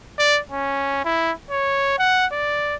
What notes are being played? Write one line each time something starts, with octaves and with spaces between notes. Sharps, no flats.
D5
C#4
E4
C#5
F#5
D5